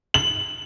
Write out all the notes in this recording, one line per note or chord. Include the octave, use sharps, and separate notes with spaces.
F#7